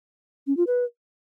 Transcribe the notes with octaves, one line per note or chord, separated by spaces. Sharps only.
C#4
F4
B4